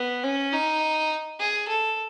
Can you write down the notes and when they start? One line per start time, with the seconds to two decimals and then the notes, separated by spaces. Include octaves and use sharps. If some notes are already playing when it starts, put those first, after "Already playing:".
Already playing: B3
0.23 C#4
0.52 D#4
1.39 G#4
1.68 A4